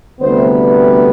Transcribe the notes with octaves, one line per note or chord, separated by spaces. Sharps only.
D2 C3 G3 B3 C5
B4